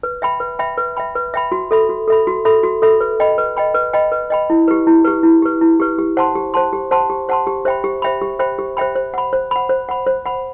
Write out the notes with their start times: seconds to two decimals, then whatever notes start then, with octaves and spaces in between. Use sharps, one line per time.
0.03 B4
0.22 E5 G5 B5
0.40 B4
0.59 E5 G5 B5
0.78 B4
0.97 E5 G5 B5
1.15 B4
1.34 E5 G5 B5
1.52 F#4
1.71 A4 E5 B5
1.89 F#4
2.07 A4 E5 B5
2.27 F#4
2.45 A4 E5 B5
2.63 F#4
2.82 A4 E5 B5
3.01 B4
3.20 D#5 G5 B5
3.38 B4
3.57 D#5 G5 B5
3.74 B4
3.93 D#5 G5 B5
4.12 B4
4.30 D#5 G5 B5
4.50 E4
4.68 G4 B4
4.87 E4
5.05 G4 B4
5.23 E4
5.42 G4 B4
5.61 E4
5.80 G4 B4
5.98 G4
6.17 C5 F#5 A5 C6
6.35 G4
6.54 C5 F#5 A5 C6
6.73 G4
6.91 C5 F#5 A5 C6
7.10 G4
7.29 C5 F#5 A5 C6
7.47 G4
7.65 C5 E5 G5 B5
7.84 G4
8.02 C5 E5 G5 B5
8.21 G4
8.39 C5 E5 G5 B5
8.59 G4
8.77 C5 E5 G5 B5
8.95 C5
9.14 F#5 B5
9.33 C5
9.51 F#5 B5
9.69 C5
9.89 F#5 B5
10.06 C5
10.26 F#5 B5